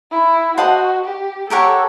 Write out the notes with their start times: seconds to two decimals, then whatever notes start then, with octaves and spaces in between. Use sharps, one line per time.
0.11 E4
0.57 F#4 C5 D#5 F#5 A5
1.04 G4
1.50 G4 A4 A#4 C#5 F#5